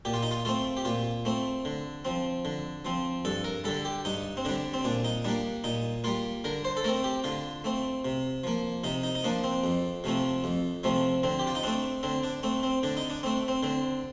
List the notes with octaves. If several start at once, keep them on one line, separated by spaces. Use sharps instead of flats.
A#2 G4
F4
D#4
F4
A3 C4 F4
G4
A#2 F4
A3 C4
D3
F3 C4
D3
F3 C4
G2 A4
A#4
D3 G3 A4
G4
G2 D#4
C4
D3 G3 D4
C4
A#2 D4
D#4
G3 A#3 D4
A#2 D#4
G3 A#3 F4
D3 A#4
C5
A4
A3 C4 A#4
G4
D3 F4
A3 C4
C3
F3 A#3
C3 D#4
D#4
D#4
F3 A#3 D4
C4
F2
C3 F3 A3 C4
F2
C3 F3 A3 C4
D3 C4
G4
F4
D#4
A3 C4 D4
D3 C4
D4
A3 C4
C4
D3 D4
D#4
D4
A3 C4
C4
D3 C4